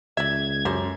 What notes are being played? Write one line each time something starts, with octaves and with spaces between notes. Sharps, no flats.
C#2 D5 E5 G#6
F#2 G4 A4 C5